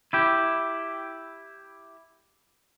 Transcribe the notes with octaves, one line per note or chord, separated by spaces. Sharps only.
E4 G4